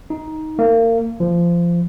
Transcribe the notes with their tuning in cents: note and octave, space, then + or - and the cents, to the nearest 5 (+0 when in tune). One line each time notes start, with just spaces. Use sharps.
D#4 +10
A#3 -30
F3 -20